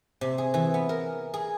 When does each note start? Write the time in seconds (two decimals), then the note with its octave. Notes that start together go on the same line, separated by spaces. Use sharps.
0.21 C3
0.38 G#4
0.54 E3
0.74 B3
0.89 A#4
1.34 G#4